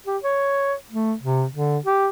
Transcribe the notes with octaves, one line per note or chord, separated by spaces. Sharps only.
G4
C#5
A3
C3
D3
G4